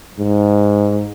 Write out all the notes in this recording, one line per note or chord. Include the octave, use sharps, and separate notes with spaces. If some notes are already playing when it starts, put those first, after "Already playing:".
G#2